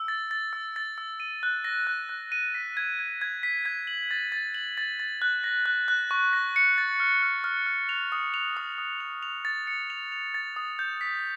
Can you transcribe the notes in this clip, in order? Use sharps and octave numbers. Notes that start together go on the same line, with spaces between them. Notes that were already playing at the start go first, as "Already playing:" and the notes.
Already playing: E6
A6
A6
E6
A6
E6
D#7
F#6
A#6
F#6
F#6
D#7
B6
G#6
G#6
G#6
B6
G#6
F#7
A6
A6
F#7
A6
A6
F#6
A#6
F#6
F#6
C#6
A#6
C#7
A6
F6
F6
F6
F6
F7
D#6
F7
D#6
D#6
F7
F7
A6
C#7
F7
F7
A6
D#6
G6
B6